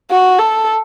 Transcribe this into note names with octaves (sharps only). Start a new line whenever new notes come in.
F#4
A4